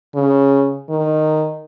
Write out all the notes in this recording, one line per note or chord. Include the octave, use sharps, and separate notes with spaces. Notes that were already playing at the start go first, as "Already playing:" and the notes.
C#3
D#3